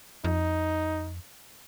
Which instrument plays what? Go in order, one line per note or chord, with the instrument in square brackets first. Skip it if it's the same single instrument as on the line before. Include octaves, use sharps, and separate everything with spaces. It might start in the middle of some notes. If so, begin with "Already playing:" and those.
[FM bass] F2 [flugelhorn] D#4